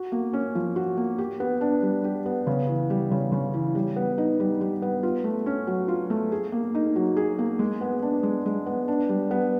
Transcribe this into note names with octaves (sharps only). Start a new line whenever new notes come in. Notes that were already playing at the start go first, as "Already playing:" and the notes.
Already playing: F#4
A#3
C#4
F3
F#4
A#3
G4
B3
D4
G3
G4
B3
C#3
E3
G3
C#3
C#3
E3
G3
B3
D#4
G3
G3
B3
F4
A3
C#4
F#3
F4
A3
G#4
A#3
D#4
F#3
G#4
A#3
G#3
B3
D4
G#3
G#3
B3
D4
G3
B3